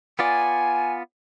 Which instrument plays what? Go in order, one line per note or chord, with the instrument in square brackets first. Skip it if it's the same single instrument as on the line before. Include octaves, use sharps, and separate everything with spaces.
[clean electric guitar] B3 F4 D5 [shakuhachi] G#5